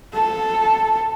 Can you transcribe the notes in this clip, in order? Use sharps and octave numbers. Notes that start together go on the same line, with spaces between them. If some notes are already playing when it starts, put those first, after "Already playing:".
A4